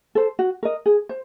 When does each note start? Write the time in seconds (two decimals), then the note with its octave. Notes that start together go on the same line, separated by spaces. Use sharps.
0.15 A4 C5
0.39 F#4
0.63 A#4 D#5
0.86 G#4
1.09 C5